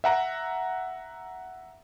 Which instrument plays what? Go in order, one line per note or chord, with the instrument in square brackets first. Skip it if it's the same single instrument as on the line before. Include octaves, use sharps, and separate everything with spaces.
[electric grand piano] E5 F#5 A#5